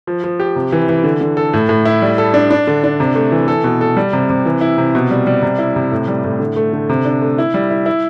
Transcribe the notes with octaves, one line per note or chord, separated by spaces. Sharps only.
F3
F3
G4
C3
E3
E3
D3
D3
A4
A2
A2
E4
G3
A4
D4
D4
D3
D4
C3
A3
E3
A4
B2
A4
G3
C3
C3
E3
E4
C3
B2
G3
G3
C3
E4
C3
A2
G3
A2
D3
A3
D3
C3
D4
A3
E4
G3
E4
E4